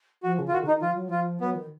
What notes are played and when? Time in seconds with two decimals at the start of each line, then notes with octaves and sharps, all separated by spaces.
0.23 F3 F#4
0.38 C#3
0.48 F4
0.53 D#3 F#4
0.63 C#3
0.67 D#3 D#4
0.82 F3 F4
0.94 F#3
1.08 F3 F4
1.41 F#3 B3
1.55 D#3